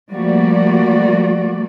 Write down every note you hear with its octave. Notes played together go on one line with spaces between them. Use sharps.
F3 G3 A3 A#3 F#4 D5